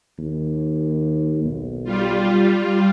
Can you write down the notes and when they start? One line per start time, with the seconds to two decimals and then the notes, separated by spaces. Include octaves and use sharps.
0.18 D#2
1.43 B1
1.84 G3 F4